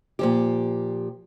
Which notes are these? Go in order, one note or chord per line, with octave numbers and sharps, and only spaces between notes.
A#2 F3 G4